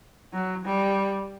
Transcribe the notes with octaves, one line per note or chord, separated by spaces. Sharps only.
F#3
G3